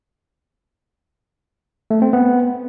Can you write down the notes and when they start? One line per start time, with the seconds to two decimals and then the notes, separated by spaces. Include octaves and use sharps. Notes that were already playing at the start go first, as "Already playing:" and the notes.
1.90 A3
2.02 C4
2.13 B3